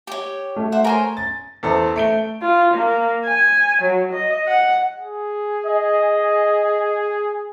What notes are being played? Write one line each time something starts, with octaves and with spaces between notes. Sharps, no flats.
G4 C#5
A3
C5 E5 F#5
A#4 C5 C#5 G#5
A6
E2 A4 C5
A3 D7 G7
F4
A#3
G#5
F#3
D#5
F#5
G#4
D#5